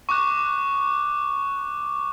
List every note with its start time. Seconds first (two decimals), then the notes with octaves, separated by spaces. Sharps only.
0.09 C#6 D6 F#6